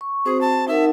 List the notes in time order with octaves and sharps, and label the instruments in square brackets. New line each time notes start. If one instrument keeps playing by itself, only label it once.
[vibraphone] C#6
[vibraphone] C4 F#4 C5 [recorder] G#4
[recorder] A5
[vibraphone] D#4 A#4 F#5 [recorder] E5